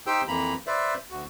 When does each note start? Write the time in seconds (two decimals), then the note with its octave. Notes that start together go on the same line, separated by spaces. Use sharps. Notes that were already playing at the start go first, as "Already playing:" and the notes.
0.07 D#4 G4 C5 G5 E6
0.28 F2 E3 A#3 A#5 B5
0.67 B4 C5 D5 E5
1.11 D2 F#4